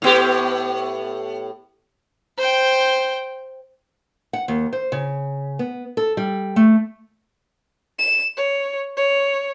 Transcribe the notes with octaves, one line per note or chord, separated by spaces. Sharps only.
A2 B3 G4
C5 G5
F#5
D#2
C5
C#3
B3
A4
G3
A3
E7
C#5
C#5